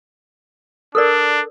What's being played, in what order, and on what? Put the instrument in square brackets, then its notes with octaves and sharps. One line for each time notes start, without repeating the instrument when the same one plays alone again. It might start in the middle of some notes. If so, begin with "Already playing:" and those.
[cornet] D4 [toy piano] A4 A#4 D5